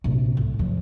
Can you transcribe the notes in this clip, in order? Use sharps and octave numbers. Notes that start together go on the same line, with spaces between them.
A#1 C3
C2 A2
E2 F3